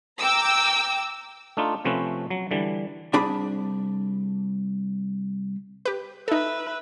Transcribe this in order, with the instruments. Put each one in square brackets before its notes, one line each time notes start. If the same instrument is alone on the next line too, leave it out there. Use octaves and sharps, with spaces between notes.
[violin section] G5 A#5 D6 E6
[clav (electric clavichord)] A3 D4 D#4 F4
C3 F3 A3 C4 C#4 B4
F#3
D3 E3 G3
[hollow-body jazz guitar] C2 D4 G#4 B5
[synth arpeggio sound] G4 B4
[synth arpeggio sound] D#4 A4 [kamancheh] B4 E5